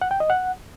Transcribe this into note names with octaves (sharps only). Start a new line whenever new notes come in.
F#5
G5
D#5
F#5